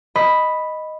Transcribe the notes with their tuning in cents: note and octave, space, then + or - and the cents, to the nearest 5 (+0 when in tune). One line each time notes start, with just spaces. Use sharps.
D#5 +0 B5 +0